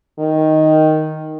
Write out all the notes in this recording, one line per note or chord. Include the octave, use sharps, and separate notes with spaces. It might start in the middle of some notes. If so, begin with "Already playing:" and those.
D#3